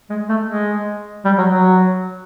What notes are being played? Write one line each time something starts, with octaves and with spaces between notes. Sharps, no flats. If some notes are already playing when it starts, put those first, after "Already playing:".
G#3
A3
G#3
G3
F#3
F#3